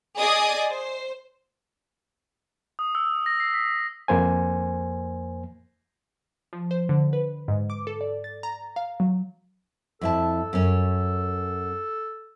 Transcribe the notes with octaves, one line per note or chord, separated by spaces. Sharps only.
G#4 D5 D#5 G#5 D#6
C5
D#6
E6
A#6
C7
B6
F2 A#3 C5 G#5
F3
C5
D3
B4
G#2
D6
A4
D5
A6
A#5
F5
F#3
F2 E4 A4 A5
F#2 C#4